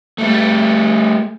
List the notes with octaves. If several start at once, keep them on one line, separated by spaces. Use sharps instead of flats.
G3 A3